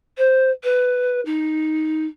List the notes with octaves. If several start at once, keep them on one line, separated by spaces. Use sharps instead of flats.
C5
B4
D#4